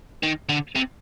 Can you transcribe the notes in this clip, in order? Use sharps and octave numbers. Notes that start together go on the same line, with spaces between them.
D#3
D3
C3